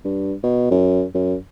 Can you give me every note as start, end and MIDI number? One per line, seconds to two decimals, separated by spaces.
0.05 0.34 43
0.43 0.70 47
0.71 1.04 42
1.15 1.36 42